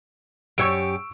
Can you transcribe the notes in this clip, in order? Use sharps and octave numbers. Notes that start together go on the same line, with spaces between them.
F#2 G4 C#5 C#6 E6 D7